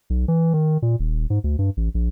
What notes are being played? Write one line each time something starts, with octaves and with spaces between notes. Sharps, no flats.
B1
E3
D#3
A#2
D#1
G#2
D2
G2
A1
A#1